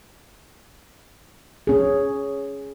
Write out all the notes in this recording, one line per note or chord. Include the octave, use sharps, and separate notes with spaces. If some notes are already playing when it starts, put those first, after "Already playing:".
C#4 G#4